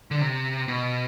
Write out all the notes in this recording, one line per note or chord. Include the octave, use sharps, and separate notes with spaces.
D3
C3
B2